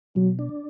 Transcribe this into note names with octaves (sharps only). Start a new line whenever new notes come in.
B2 F#3
D4